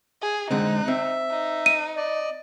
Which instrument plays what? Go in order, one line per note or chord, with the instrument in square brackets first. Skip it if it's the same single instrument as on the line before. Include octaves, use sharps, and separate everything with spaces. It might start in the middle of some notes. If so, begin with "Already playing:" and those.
[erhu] G#4
[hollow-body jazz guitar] D3 G#3 C4 [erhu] D#4 [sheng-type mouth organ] F#6
[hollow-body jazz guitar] C4 [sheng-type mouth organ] E5
[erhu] D#4
[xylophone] D#7
[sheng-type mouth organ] D5 D#5